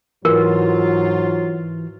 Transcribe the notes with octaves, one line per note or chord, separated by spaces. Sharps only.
G#2 E3 F#3 F4 A#4